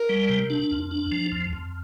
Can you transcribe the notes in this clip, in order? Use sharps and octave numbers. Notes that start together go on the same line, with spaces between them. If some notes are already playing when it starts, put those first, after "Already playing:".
Already playing: A#4
G3
C3
D4
F2
D4
F3
F2
F2